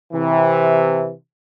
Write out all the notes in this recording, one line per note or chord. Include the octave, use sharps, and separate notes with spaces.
C3 E3